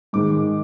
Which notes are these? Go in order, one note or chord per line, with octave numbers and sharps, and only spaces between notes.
G#2 D#3 G#3 D6